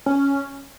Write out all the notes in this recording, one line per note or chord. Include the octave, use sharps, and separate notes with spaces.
C#4